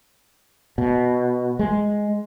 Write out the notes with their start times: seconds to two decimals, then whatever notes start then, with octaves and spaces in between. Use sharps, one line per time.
0.78 B2
1.59 G#3